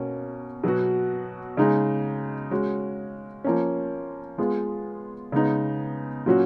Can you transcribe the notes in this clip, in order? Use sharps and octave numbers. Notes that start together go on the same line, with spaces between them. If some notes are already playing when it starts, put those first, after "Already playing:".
Already playing: B2 A#3 C#4
B2 F#3 B3 F#4
C#3 G#3 D#4 G#4
G#3 C#4 F#4
F3 A#3 C#4
G#3 B3 F4 G#4
C#3 G#3 B3 D#4
A#2 F#3 C#4 F#4